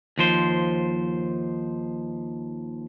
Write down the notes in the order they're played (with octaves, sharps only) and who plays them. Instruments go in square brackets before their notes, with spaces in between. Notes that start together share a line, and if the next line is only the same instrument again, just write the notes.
[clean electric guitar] D#2 F3 C5